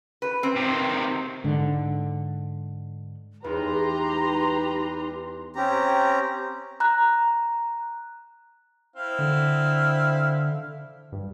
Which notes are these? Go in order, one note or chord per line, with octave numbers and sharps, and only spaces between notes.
B4
C4
C3 D#3
G#2 D3
E2 D#4 G4 B4 A#5 C6
C4 C#4 G4 A#5
A#5 F#6
C4 E4 F5
D3
G2